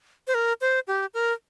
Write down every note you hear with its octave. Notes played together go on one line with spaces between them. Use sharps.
C5
A#4
C5
G4
A#4